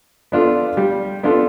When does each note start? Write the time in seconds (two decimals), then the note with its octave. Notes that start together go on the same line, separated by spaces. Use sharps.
0.32 B3 D4 F4 A4
0.77 G3
1.23 B3 D4 F4 A4